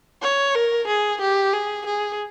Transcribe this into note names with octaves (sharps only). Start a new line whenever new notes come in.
C#5
A#4
G#4
G4
G#4
G#4